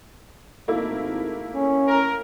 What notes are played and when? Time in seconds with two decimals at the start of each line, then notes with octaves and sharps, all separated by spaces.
0.68 G#1 A3 A#3 E4
1.54 C#4
1.87 A#4